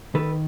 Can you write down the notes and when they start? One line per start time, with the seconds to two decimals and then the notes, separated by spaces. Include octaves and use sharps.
0.15 D#3 A4 B4